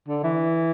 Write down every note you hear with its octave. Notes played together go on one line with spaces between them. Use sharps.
D3
E3